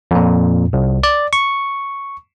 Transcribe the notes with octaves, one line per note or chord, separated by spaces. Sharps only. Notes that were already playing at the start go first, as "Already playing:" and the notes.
F2 A#2
C2
D5
C#6